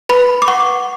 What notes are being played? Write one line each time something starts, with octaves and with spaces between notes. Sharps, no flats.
B4 B5
D6
F#5 C#6